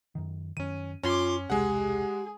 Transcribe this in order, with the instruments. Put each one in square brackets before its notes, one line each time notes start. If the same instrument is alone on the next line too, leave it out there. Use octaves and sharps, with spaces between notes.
[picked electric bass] F#2 D#3
[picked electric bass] F#2 D#3 [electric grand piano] C#4 D#7
[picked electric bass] F#2 [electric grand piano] C#4 [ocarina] F4 [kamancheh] C6 D6
[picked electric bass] E1 C2 [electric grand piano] G#3 F#5 [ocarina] G4 [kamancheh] G#4